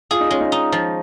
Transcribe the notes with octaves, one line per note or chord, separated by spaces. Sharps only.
F4 G#4
D#4
G#3 C#4
D#4
D#4
F3